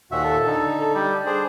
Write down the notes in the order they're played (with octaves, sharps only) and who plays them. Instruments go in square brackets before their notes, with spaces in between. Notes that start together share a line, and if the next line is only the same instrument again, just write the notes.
[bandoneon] D#2 A#2 E5 [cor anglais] F#4
[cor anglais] A4
[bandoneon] D3 D#4
[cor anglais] A4
G3
[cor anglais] D4 [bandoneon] G#4 C5